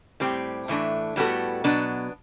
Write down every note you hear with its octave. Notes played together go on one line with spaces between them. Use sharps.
A2 G3 C4 G4
A2 E3 A3 D4
A2 G3 B3 F#4 A4
B2 F#3 B3 D4